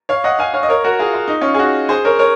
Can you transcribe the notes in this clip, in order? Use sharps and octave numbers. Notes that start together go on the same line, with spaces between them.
C#5 F5
D#5 F#5
F5 G#5
C#5 F5
D#5
A#4 C#5
F#4 A#4
F4 G#4
F4
D#4
C#4 F4
G#4
D#4 F#4
G#4 C5
A#4 C#5
A#4 C#5